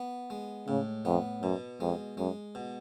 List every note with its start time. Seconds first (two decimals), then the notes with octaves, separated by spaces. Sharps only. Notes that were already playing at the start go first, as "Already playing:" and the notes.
Already playing: B3
0.30 G#3
0.68 A2 C#3
1.05 F2 B3
1.42 F#2 B2
1.80 F2 G#3
2.18 F#2 G#3
2.55 B2